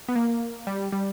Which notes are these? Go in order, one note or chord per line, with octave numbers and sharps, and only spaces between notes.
B3
A#3
G3
G3